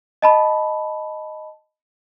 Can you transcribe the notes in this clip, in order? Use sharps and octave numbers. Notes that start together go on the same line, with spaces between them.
D#5 A5 B5